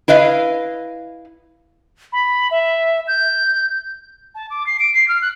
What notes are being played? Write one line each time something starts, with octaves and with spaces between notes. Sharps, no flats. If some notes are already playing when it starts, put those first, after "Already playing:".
E4 B4 D#5 F5
B5
E5
G6
A5
D6
C7
D7
C7
F6
F#6